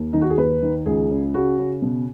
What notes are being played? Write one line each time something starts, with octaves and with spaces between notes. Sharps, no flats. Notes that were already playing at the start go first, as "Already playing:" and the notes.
Already playing: D#2
D#3 D#4
F#4
G#4
D#2 B4
D#3
C#2 G#4
C#3
C#3 F#4
C#3
B2